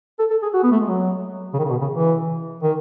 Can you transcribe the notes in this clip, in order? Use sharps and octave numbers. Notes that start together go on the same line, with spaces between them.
A4
A4
G#4
F#4
B3
A3
G#3
F#3
C#3
D#3
C#3
B2
C#3
E3
D#3